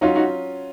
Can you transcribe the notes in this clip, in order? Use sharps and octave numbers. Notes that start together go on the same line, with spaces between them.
F#3 C#4 D#4 F4 F#4
D#4 F#4